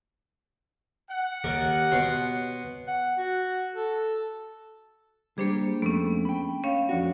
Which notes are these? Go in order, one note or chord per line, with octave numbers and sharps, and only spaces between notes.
F#5
D#2 A#4 D6
B2 C#5 C6
F#5
F#4
A4
G3 A#3 D4 G4 G#4 C5
F2 A3 B3 C#4
G5 B5
C#4 C#5 F5
F2 D4 F#4